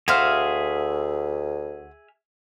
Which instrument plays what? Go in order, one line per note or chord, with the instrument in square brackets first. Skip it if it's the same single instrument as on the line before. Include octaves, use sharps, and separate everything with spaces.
[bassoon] D2 [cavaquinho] F#4 C5 F5 [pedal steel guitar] G#4 E5 F6